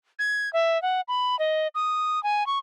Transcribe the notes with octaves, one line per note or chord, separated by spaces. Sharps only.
G#6
E5
F#5
B5
D#5
D#6
G#5
C#6